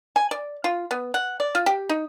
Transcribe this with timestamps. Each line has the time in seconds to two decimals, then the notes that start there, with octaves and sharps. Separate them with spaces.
0.16 G#5
0.31 D5
0.64 F4
0.91 B3
1.14 F#5
1.40 D5
1.55 F4
1.66 G4
1.89 D#4